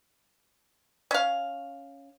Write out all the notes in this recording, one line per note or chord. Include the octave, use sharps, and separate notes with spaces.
C#4 F5